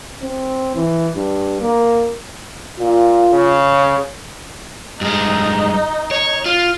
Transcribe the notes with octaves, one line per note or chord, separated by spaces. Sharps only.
C4
E3
G2
A#3
A#2 F4
C#3
G2 G#3 D#4
C#5
F4